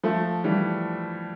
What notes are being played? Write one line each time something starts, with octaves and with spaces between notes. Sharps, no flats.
F3 A3
E3 G3